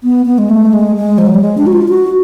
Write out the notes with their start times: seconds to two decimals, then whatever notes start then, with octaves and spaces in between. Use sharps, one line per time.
0.03 B3
0.26 B3
0.38 G#3
0.50 A3
0.73 G#3
0.96 G#3
1.18 F3
1.26 F#3
1.34 G3
1.42 G#3
1.58 D4
1.67 F#4
1.73 F4
1.89 F#4